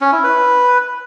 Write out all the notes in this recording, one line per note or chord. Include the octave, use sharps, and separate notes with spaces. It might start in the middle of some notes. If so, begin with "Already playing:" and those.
C#4
E4
B4